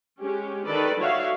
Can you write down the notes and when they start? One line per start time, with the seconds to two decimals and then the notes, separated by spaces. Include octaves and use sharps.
0.20 G#3 C#4 G4
0.66 D#3 A4 B4 D5
1.01 F#4 C#5 E5 F5